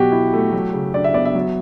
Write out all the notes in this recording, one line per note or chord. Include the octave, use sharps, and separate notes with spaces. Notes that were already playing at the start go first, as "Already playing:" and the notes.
Already playing: B2 F#3 F#4 G4
E4
A3
F#3
C#3
D4 D5
E5
B3 D5
E5
F#3